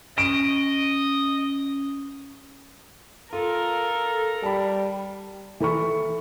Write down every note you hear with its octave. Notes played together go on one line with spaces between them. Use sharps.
C#4 D#5 D7
F4 A4 A#4
G3 A5 B5
E3 A4 B5 C#6